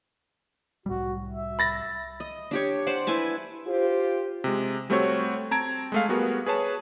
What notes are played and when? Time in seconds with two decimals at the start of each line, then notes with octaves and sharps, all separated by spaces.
0.86 C2 A2 G3 F#4
1.29 E5
1.59 B5 A6 A#6
2.20 D#5
2.51 D4 G4 C#5
2.87 C5 D5 F#5
3.07 E4 B4 G#5 A5
3.67 F4 G4 C5
4.44 C3 G#3
4.90 G3 A3 C4 F#4 C5 C#5
5.51 C4 A5 A#5 G#6 D7
5.92 G#3 A3 F5
6.09 G3 B3 F#4 G#4 A#4
6.46 G#4 B4 C#5 A5